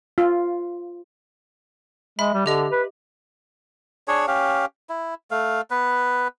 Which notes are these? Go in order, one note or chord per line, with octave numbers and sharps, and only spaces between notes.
F4
G#3 E5 B5
G3
D3 G4 D#5 F7
B4
D4 G#4 C#5
C#4 G4 F5
E4
A3 F5
B3 B4